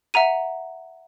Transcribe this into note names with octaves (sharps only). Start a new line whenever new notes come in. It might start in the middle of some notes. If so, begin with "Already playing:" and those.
E5 F#5 A#5 D#7